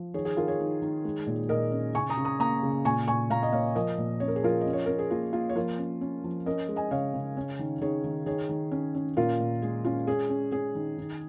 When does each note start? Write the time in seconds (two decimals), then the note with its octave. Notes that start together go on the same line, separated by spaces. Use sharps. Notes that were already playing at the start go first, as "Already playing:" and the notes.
Already playing: F3
0.14 D#3 G#4 C#5
0.25 G#4
0.37 D#3 F4 A#4
0.48 G#4 C#5
0.60 D#3
0.82 D#3
1.05 G#3
1.27 A#2
1.49 A#2 A#4 D#5
1.72 C#4
1.94 C#3 G#5 C#6
2.10 A#5 D#6
2.17 C#3
2.25 A#5 D#6
2.40 A#3 A#5 D#6
2.63 C#3
2.85 A#2 G#5 C#6
3.07 A#2 G#5 C#6
3.30 A#2 F5 A#5
3.43 D#5
3.52 A#3 C#5 F5
3.75 F3 A#4 D#5
3.98 A#2
4.20 C#4 C#5
4.28 A#4
4.36 G#4
4.43 F3 F4 A#4
4.61 C#4 D#5
4.73 C#5
4.86 C#4 A#4
4.99 G#4
5.11 A#3 F4
5.33 A#3 F4
5.49 C#5
5.55 F3 F4 A#4
5.78 C#4
6.01 C#4
6.24 F3
6.46 C#4 A#4 D#5
6.69 G#3
6.76 D#5 G#5
6.91 C#3 C#5 F5
7.14 C#3
7.37 C#4
7.59 D#3
7.81 D#3 G#4 C#5
8.04 D#3
8.26 D#3 G#4 C#5
8.49 D#3
8.72 C#4
8.95 C#4
9.17 A#2 F4 A#4
9.40 A#2
9.62 G#3 G#4
9.85 C#4 F4
10.07 C#4 G#4
10.29 C#4
10.52 C#4 G#4
10.75 D#3
10.98 D#3